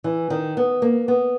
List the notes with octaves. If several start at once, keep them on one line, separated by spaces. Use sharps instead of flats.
E3
D#3
B3
A#3
B3